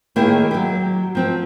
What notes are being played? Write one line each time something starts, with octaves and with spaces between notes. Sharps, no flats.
A2 D#3 A#3 G4 G#4 E5
F#3 G4
F3 C4